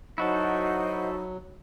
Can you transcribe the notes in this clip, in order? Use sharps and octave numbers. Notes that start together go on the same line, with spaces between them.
F#3 D#4 E4 F#4 A4 C5 D#5 F#5